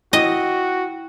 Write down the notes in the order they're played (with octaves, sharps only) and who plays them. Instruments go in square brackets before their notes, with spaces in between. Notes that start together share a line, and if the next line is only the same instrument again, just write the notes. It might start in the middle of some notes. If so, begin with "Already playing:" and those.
[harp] E4 G5 B6 [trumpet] F#4 [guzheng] D#5